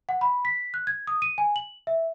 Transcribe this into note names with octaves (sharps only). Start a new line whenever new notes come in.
F#5
B5
B6
F#6
G#6
D#6
D#7
G#5
F#7
E5